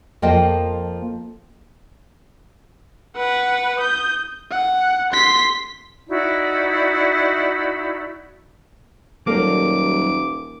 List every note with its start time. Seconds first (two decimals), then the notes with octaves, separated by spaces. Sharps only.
0.22 F2 F3 A#3 D#5 G5 A5
3.17 B4 F#5
3.79 D#6 G6
4.51 F#5
5.13 C6 B6
6.08 D#4 E4 F#4 D5
9.27 D#1 F#3 G3 A#3 A4 D6